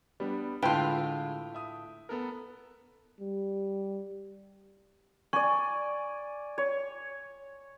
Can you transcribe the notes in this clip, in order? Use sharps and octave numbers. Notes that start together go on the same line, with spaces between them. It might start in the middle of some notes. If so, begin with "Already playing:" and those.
G3 B3 D4
A2 D3 G#3 E4 F4 B4 G5 A5
E5 D#6
B3 A4 A#4
G3
D5 G#5 C#6
C#5